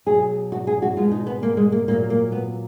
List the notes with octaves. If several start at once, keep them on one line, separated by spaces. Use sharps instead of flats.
B2 F#3 G#4
F#4
G#4
F#4
B2 G#3 F4
D#4
B3
A#3
G#3
A#3
A#2 F#3 A#3
A#3
B3